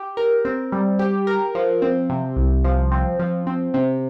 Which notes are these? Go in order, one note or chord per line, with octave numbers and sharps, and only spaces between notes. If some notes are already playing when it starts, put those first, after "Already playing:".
Already playing: G4
A#4
C4
G3
G4
A#4
F3
C4
C3
C2
F3
C4
F3
C4
C3